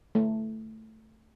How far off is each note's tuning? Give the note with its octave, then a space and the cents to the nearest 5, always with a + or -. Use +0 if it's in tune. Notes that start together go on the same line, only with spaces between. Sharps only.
A3 +0